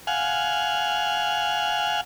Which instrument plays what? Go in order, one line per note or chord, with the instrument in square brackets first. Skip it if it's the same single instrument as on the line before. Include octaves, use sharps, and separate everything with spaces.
[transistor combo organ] F5 F#5 G#5